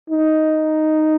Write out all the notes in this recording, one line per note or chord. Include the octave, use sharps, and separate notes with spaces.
D#4